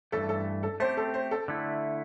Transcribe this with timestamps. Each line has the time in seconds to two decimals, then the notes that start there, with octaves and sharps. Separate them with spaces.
0.12 G2 E3 A3 A4
0.29 A4
0.63 A4
0.80 A3 C4 G4 C5
0.97 A4
1.14 C5
1.31 A4
1.48 D3 A3 E4